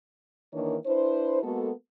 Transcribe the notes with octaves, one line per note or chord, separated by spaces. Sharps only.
D#3 E3 A#3 D4 A#4 C#5
D4 E4 B4 C5
G#3 A#3 B3 F#4 A4